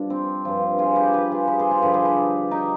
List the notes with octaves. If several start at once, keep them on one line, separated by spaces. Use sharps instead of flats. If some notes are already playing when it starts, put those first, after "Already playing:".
Already playing: G2 F3 D4
C4
G2 F3
F4 G#4
G4 B4
G4 B4
F4 G#4
G4 B4
G#4 C5
F4 G#4
G2 D3 F3 G4 B4
G#4 C5
G4 B4
D#4 G4